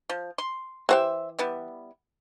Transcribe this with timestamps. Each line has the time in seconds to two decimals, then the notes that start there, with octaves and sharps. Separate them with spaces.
0.09 F3
0.38 C6
0.89 E3 F#4 G4 C5 E5
1.39 G3 B3 E4